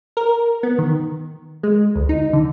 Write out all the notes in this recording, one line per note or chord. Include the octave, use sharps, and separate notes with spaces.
A#4
B3
D#3
G#3
D2
D#4
D3